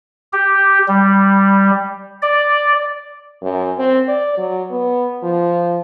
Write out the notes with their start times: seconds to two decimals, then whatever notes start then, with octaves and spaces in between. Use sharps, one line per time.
0.33 G4
0.88 G3
2.22 D5
3.43 F#2
3.78 C4
4.08 D5
4.38 F#3
4.71 B3
5.23 F3